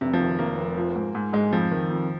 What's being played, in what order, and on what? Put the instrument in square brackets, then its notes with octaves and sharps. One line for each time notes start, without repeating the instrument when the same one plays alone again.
[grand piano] F1 [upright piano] C3
[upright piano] F3
[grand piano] D#3
[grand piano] F1 [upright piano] A#3
[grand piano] F1
F3
G#2
G#2
[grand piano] G#2 [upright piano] G#3
[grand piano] F2 [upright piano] F3
[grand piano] D#3
F2